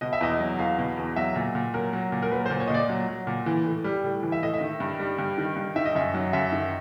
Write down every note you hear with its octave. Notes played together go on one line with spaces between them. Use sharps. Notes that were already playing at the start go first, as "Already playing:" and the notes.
B2 D#5
E5
E2 D#5
F#3
E2 F5
B2
E2
F#3 E5
A#2
A#2
F#3 A#4
F#3
A#2
A#4
F#3 B4
C5
A#2
C#5
D#5
A#2 D5
F#3
F#3
A#2
E3
A2
G3
A2
E3
E5
A2 D#5
E5
D#3
G2
G3
G2
D#3
G2
D#3 E5
D#5
F#2 E5
F#3
F#2 E5
D#3